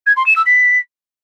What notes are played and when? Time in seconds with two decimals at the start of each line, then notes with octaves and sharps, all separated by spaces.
0.06 G#6
0.16 C6
0.26 E7
0.36 E6
0.46 B6